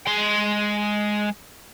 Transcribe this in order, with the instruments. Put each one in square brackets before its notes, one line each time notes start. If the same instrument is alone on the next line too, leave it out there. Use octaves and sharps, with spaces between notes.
[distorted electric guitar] G#3 C6